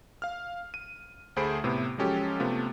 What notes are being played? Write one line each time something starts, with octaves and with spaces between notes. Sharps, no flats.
F5 F6
D#7
D2 A3 G#4 C5 B5 D7
A2 C3 B3 E4
F3 F#3 G#3 C#4 G4 A4
C3 A3 B3 F4